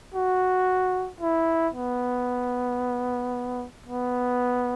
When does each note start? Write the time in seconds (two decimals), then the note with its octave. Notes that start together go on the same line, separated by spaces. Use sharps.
0.14 F#4
1.21 E4
1.74 B3
3.86 B3